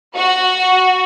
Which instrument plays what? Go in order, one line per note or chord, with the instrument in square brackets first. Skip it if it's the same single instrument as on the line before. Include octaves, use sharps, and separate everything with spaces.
[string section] F#4